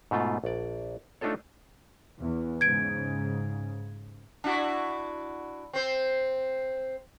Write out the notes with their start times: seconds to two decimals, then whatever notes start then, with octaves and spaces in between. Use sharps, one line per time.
0.11 G#2 B2 A3 F4
0.44 A#1 D5
1.21 A3 D4 D#4 F4 A4 C#5
2.18 E2
2.61 G#2 C#3 G#6 D7
4.44 D4 E4 F#4
5.73 C4 C5